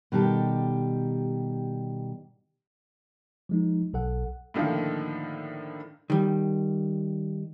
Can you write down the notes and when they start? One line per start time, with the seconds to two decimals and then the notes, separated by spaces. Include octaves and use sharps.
0.12 B2 D#3 G3 G4 A4
3.49 F3 G#3 D#4
3.93 B1 A4 F#5
4.54 A2 D3 D#3 F3 A#3
6.10 D#3 G3